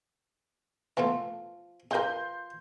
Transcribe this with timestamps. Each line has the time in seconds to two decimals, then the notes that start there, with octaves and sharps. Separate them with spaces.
0.97 B2 E3 F3 A3
1.91 F3 G#4 A#4 B4 C6 G6